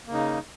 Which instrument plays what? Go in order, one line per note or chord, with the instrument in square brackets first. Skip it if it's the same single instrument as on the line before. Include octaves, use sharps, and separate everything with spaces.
[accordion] A#3
C#3
D#4